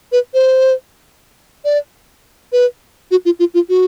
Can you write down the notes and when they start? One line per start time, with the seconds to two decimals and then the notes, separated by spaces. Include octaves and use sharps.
0.12 B4
0.34 C5
1.65 D5
2.52 B4
3.11 F#4
3.25 F4
3.39 F4
3.54 F4
3.69 F#4